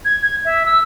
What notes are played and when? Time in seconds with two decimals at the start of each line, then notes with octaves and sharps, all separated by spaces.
0.05 G#6
0.22 G#6
0.45 E5
0.66 E6